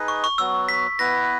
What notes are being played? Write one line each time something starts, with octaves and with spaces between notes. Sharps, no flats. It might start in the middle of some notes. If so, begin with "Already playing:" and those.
Already playing: D#4 G#4 B4 D#5
C#6
C#6
F#3 B3 F#4 E6
B6
B3 E4 B4 A#6